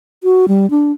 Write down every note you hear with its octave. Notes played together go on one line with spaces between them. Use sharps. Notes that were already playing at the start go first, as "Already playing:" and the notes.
F#4
G3
D4